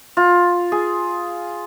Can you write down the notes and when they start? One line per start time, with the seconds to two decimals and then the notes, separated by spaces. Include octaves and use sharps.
0.17 F4
0.72 G#4